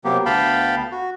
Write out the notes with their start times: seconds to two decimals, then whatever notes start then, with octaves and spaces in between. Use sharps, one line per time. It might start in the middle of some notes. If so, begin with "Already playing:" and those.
0.05 C3 F#3 A#3 B3 G4
0.26 D2 B3 F5 G5 A5 B5
0.92 F#4